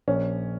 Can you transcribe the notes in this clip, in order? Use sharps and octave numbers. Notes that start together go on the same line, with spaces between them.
A#1 C#4